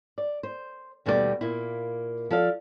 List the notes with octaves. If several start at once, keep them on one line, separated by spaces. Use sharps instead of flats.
D5
C5
D#2 B2 G3 A3 A#4 D5
A#2 A#3 E4
F3 A4 D5 F5